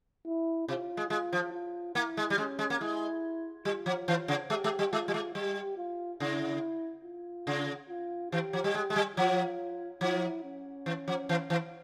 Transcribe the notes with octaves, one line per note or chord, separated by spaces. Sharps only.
E4
C3 F4
G#3
G#3 F4
F3
F4
A#3 E4
G#3
G3
G#3 C#4
G#3
A#3
G#3 E4
G3 F4
F3
E3
C#3
G#3 G4
G#3
G3
G#3 F4
G3
G#3
G3 G4
F4
C#3 E4
F4
C#3
F4
E3 G4
F3
G3
G#3
G#3
G3
F3 F4
F3 E4
C#4
E3
F3
E3
E3